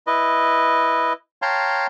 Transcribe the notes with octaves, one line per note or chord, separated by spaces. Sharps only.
E4 B4 D#5
C#5 F5 G5 A5 A#5 C6